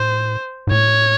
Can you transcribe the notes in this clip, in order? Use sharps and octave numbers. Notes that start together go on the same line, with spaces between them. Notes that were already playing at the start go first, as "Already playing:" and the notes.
Already playing: A2 C5
G#2
A2 C#5